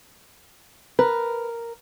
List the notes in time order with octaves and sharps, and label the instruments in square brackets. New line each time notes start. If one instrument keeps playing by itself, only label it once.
[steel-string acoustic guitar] A#4 [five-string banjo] B4